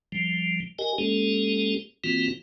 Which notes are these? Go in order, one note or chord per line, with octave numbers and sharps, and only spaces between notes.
F3 G3
G4 A#4 D#5 G#5
G#3 A#3 C#4 G4 A4
E3 A#3 C4 F4 F#4